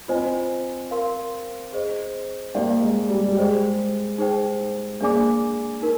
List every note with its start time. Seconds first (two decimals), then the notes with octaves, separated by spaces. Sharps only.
0.08 C4 F4 C5 D#5 G#5
0.91 A#4 F5 C6
1.73 G#4 C5 D#5
2.54 A#3 D#4 G4 D5 G5
2.82 G#3
3.10 G3
3.28 G3
3.36 G#3 G#4 C5 G5
4.18 D#4 G#4 C5 G5
5.00 A#3 D4 G#4 D5 G#5 D6
5.82 D#4 A#4